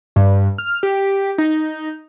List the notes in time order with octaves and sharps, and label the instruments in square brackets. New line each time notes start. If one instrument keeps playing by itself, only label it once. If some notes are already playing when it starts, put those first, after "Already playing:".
[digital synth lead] G2
F6
G4
D#4